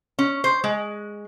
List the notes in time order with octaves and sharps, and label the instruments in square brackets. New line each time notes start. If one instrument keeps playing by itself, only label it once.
[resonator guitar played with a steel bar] C#4
C5
G#3